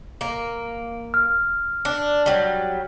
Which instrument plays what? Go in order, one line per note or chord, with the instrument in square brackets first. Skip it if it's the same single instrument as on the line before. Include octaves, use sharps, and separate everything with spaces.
[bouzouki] A#3
[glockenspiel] F6
[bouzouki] D4
F#3 G3